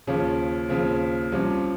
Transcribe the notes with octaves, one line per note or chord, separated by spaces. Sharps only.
D#2 C#3 F3 C#4
D#2 C#3 F3 C4
C2 C3 F3 C#4